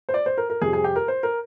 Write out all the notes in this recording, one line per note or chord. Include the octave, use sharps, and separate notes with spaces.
C5
D5
C5
A#4
A#4
F2 C3 G3 G#4
G#4
G4
A#4
C5
A#4